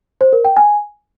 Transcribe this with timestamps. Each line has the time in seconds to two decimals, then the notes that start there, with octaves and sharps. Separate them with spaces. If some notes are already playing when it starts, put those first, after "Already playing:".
0.21 C5
0.33 A#4
0.45 G5
0.57 G#5